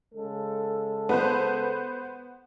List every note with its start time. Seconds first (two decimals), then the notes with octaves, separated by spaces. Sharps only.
0.14 C#3 G#3 A4
1.09 B3 B4 C5